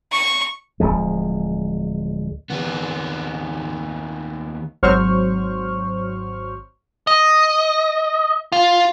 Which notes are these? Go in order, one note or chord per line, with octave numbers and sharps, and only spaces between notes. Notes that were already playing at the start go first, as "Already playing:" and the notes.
C#6
D1 D#2 F3 G#3
D#2 B3
G#1 F#3 C5 C#6 F6
D#5
F4